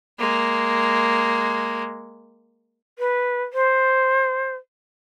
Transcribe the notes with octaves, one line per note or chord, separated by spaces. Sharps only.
G#3 A#3
B4
C5